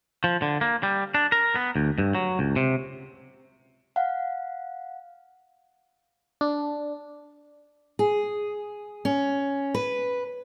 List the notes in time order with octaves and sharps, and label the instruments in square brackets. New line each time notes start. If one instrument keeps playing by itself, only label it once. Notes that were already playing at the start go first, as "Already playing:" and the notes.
[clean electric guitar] F3
D3
A#3
G3
D4
A#4
B3
D2
G2
F#3
C#2
C3
[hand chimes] F5 F#5
[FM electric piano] D4
[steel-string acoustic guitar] G#4
C#4
B4